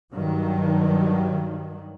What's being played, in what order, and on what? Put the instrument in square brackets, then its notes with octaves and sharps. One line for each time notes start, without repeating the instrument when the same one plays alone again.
[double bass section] G2 D#3 F#3